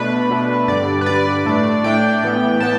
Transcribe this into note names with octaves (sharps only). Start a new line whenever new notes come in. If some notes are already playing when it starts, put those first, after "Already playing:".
Already playing: B2 A3 D4 B4
B2 A3 D4
G2 D3 G3 D5
B4
G2 D3 G3 D5
A2 A3 D4
A2 A3 D4 G5
A2 E3 B3
A2 E3 B3 A5